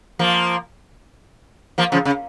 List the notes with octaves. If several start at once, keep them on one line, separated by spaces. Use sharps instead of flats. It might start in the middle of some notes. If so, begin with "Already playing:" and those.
F3 A#3
F3 A#3
C#3 F3
C#3